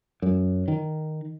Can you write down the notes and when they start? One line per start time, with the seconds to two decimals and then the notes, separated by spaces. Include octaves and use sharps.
0.22 F#2
0.68 D#3